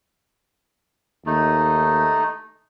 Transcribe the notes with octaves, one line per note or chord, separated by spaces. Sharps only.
D#2 A3 D#4